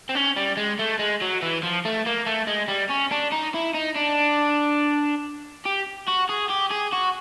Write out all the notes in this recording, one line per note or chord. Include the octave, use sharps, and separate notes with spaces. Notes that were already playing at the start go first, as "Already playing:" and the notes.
C4
C#4
G3
G#3
A3
G#3
F#3
E3
F3
A3
A#3
A3
G#3
G3
C#4
D4
D#4
E4
D#4
D4
G4
F#4
G#4
G4
G#4
F#4